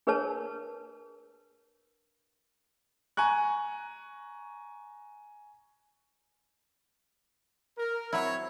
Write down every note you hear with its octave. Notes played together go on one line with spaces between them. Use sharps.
D4 G#4 A#4 B4 C#5 A5
G#5 A#5 C#6 F#6
A#4
F#3 C4 E4 C#5